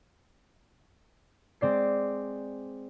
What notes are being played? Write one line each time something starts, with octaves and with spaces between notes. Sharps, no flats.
G#3 C4 D5 C7